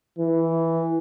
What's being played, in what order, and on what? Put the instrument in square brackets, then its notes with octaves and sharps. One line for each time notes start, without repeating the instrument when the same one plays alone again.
[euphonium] E3